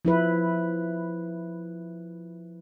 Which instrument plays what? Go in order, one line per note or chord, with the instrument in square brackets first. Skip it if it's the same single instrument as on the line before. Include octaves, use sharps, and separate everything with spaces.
[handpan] F3 E4 B4